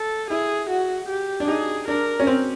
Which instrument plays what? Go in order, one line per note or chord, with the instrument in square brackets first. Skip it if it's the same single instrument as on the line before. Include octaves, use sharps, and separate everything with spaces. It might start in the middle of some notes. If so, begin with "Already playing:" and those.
Already playing: [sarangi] A4
[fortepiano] E4 [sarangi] G#4
[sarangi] F#4
G4
[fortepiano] D4
[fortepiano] D#4 [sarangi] G#4
[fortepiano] D4 [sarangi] A#4
[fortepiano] C#4
C4